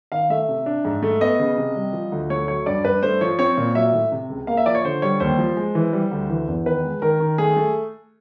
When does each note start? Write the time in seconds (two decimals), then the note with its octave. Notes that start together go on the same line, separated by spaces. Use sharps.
0.12 D#3 F5
0.30 A3 E5
0.49 C3
0.66 D4
0.85 G#2
1.03 A3
1.21 B3 D#5
1.39 C#3
1.57 C3
1.76 G3
1.93 F3
2.12 D2
2.30 A3 C#5
2.48 F#3 C#5
2.66 G2 D5
2.84 G2 B4
3.03 A3 C5
3.21 F3 C#5
3.39 C4 C#5
3.57 A#2
3.75 F#3 E5
3.93 A2
4.12 C3
4.30 C#2
4.47 A#3 F5
4.57 E5
4.66 F3 D5
4.75 C#5
4.84 D3 C5
5.02 G3 C#5
5.20 D#2 C5
5.39 F3
5.57 G#3
5.75 E3
5.93 G3
6.11 D2
6.30 E3
6.48 E2
6.66 D#3 B4
6.84 G#3
7.02 D#3 A#4
7.20 D#3
7.38 A3 G#4
7.57 A3